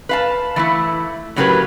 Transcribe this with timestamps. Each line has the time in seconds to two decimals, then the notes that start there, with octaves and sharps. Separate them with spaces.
0.09 B4 F5 A5
0.56 E3 A3 E4
1.36 A2 C#3 F#3 G4 A#4 B4